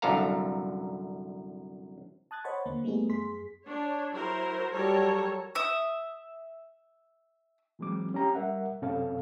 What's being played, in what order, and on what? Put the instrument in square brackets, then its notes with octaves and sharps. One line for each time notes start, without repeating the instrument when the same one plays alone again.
[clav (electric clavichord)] C2 F#2 D3 A4 F5 A#5
[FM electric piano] A5 D#6 F#6 G#6 A6
C5 C#5 D#5 F#5 B5 C#6
D#2 D3 A#3
G3 A3 B3 D#4 G#4
F#2 G#4 C6 B6
[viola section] D4 C#5
F#3 E4 A#4 C5
F#3 G3 A4 A#4 C#5
[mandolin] E5 D#6
[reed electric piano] E3 F#3 G#3 C4 D6
C#4 G4 A#5
G3 A#4 E5 F#5
F#2 C3 C4 C#4 A4 F5